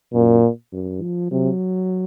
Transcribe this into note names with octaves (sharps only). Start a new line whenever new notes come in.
F#2 A#2
F#2
F3
C3 F#3